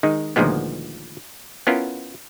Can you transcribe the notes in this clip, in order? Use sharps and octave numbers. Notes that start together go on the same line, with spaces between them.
D#3 G#3 D#4
D2 A#2 D#3 F3 G#3 B3
B3 C#4 E4 F4 A#4